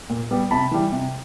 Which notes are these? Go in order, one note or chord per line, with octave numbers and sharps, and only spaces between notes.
A#2
G3 B3
C3 A5 B5
E3 G3
C3